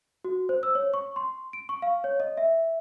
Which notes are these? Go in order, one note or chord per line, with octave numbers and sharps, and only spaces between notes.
F#4
C5
E6
C#5
C#6
C6
D7
C#6
F5
C#5
D#5
E5